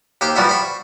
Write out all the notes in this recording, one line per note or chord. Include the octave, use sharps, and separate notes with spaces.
D#2 G4 C5 G5
E3 F3 G3 F#4 E5
C5 B5 C#6